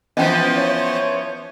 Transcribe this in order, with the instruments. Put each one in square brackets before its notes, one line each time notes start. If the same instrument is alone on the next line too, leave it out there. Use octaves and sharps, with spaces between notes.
[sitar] E3 F3 [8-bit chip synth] B3 C5 [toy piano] C#4 D#5
[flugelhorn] C#5